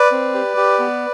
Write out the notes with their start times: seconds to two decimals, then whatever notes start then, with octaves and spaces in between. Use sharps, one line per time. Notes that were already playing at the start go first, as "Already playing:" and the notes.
Already playing: B4 D5
0.12 C4
0.34 G4
0.57 G4
0.79 B3